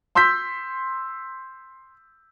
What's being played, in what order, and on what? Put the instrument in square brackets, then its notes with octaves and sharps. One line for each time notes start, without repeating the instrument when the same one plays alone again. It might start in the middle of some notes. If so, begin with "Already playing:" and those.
[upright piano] C6 E6 G6 B6